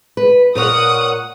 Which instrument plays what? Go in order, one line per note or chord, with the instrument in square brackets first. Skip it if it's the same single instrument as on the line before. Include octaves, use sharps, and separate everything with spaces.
[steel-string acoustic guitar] B4
[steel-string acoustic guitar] A#2 A#4 C#5 [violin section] F#5 D#6